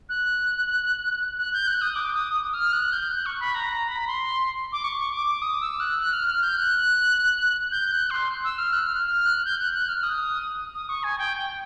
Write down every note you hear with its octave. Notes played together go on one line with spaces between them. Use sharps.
F#6
F#6
G6
F#6
D#6
D6
D#6
D#6
F6
F#6
G6
F#6
C#6
B5
A#5
A#5
B5
C6
D6
C#6
C#6
D6
D6
D#6
E6
F#6
F#6
F6
F6
G6
F#6
G6
F#6
C6
E6
F6
F#6
F6
F6
F#6
G6
F#6
F#6
F6
D#6
D#6
C#6
G#5
G5
G5